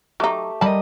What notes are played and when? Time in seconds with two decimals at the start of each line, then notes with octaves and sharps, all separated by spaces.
0.20 F#3 A3 D#4 G4 D6
0.61 G3 G4 A#4 D#5 A5 B5